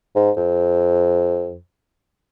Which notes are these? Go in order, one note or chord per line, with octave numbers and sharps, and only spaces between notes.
G#2
F2